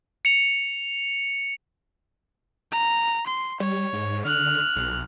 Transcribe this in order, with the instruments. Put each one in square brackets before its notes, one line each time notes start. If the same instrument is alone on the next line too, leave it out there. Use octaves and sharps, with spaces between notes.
[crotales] C#7 F7
[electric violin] A#5
C6
[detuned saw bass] G3 [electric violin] C#5
[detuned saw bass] G#2
[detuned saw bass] D3 [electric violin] F6 F#6
[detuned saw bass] B1